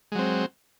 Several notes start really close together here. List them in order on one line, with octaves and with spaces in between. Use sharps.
G#3 F#3 C4